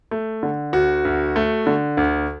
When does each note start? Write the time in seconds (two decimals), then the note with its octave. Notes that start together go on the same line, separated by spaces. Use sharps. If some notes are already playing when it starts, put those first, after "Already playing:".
0.11 A3
0.43 D3
0.73 D2 F#4
1.05 D2
1.36 A3
1.67 D3
1.97 D2